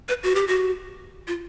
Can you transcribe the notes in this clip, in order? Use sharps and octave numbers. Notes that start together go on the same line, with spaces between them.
B4
F#4
G4
F#4
F4